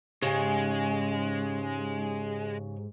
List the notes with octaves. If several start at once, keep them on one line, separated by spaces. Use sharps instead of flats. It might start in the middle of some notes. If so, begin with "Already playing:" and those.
G#2 C#3 G#3 G4 G#5